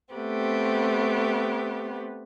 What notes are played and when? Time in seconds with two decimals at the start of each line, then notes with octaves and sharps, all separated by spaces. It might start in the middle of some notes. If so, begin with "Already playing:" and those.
0.13 A3 B3 C4 G4